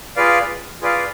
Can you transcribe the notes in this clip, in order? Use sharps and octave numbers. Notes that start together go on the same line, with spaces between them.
F4 G#4 B4 D5 F5
F4 G#4 B4 D5 F5